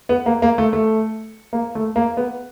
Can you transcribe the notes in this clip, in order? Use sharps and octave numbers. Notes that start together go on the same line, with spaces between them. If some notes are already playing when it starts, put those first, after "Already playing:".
B3
A#3
A#3
A3
A3
A#3
A3
A#3
B3